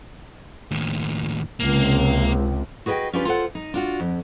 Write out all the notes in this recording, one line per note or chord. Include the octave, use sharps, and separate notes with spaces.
D#2 A2
C#2 C3 A#3
F#4 G#4 B4 D5 D#5 G5
C#4 D4 F4 G4 B4
F4 A4 C5 F#5
D#4
D4 F4 F#4
F2